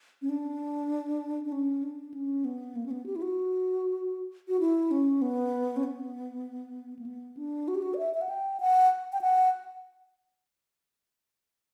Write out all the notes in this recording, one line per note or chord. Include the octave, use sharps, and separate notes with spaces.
C#4
D4
D4
C#4
D4
C#4
B3
A#3
C#4
B3
G4
E4
F#4
F#4
E4
C#4
B3
C#4
B3
A#3
B3
D4
F#4
G4
F#4
D5
E5
E5
F#5
G5
F#5
G5
F#5